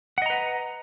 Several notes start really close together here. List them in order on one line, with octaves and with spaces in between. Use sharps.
F#5 D#5 A#5 B4